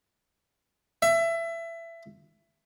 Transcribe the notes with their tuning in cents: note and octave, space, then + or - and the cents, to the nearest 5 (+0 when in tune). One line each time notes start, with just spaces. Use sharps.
E5 +20